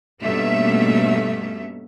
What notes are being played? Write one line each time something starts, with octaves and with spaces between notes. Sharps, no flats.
G2 B2 A3 A#3 C#4 E5